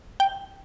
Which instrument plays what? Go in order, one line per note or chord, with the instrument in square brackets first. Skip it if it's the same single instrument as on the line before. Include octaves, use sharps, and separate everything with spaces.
[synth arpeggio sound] G5